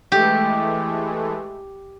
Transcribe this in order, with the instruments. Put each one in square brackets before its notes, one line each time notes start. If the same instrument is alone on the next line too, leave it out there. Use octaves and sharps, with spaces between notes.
[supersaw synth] E3 G#3 A3 [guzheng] G4